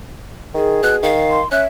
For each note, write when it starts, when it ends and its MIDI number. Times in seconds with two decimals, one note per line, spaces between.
0.54 0.83 51
0.54 1.09 68
0.83 0.98 47
0.83 0.96 90
1.03 1.41 51
1.03 1.41 77
1.30 1.51 84
1.52 1.65 61
1.52 1.67 76
1.52 1.61 90